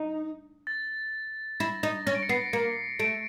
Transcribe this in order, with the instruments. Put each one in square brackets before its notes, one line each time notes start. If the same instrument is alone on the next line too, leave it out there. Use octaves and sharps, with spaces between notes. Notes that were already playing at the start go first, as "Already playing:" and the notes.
Already playing: [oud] D#4
[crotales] A6
[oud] E4 [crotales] A#6
[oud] D#4 [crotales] A#6
[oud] C#4 [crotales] A#6
[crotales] D7
C#7
[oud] B3 [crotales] C7
[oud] A#3 [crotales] C#7
[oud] A3 [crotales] D7